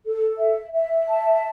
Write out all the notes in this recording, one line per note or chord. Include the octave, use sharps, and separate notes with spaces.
A4
E5
E5
A5